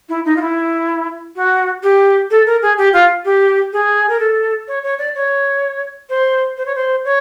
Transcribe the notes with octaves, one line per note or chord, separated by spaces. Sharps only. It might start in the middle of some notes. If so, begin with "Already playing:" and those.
E4
D#4
F4
E4
F#4
G4
A4
A#4
G#4
G4
F4
G4
G#4
A#4
A4
C#5
C#5
D5
C#5
C5
C5
C#5
C5
C#5